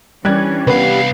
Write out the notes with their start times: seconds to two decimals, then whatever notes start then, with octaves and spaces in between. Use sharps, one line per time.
0.25 E3 G3 C#4 D4 F#6 G#6
0.67 C2 B3 B4 F5